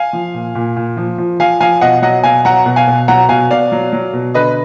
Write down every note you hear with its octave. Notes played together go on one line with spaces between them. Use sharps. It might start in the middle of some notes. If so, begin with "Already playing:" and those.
Already playing: F5 G#5
F3
A#2
A#2
A#2
F3
F3
F3 F5 G#5
F3 F5 G#5
B2 D#5 F#5
F#3 D#5 F#5
B2 F5 G#5
F#3 F#5 A#5
B2
F5 G#5
B2
F#3 F#5 A#5
B2 F5 G#5
B2 D5 F5
F#3
F#3
B2
D3 B4 D#5